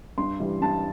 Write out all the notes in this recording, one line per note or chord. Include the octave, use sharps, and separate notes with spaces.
G2 C6
E3 G3
G2 A5